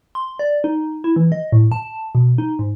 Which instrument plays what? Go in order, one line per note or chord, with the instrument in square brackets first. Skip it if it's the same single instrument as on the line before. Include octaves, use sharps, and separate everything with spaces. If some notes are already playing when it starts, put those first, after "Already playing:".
[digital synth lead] C6
D5
D#4
E4
E3
D#5
A2
A5
B2
D#4
G#2